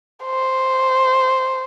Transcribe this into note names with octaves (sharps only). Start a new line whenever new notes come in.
C5